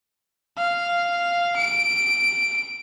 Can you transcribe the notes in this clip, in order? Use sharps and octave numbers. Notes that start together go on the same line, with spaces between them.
F5
D7